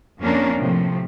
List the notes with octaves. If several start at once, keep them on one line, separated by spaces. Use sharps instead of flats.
F2 F3 A#3 C#4 D4 A#4
A2 C3 F3 A3